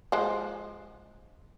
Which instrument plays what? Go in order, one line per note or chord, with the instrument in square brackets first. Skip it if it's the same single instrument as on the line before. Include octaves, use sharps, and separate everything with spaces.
[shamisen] F3 G#3